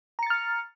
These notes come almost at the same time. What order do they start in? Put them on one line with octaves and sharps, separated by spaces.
A#5 C#7 A6 F6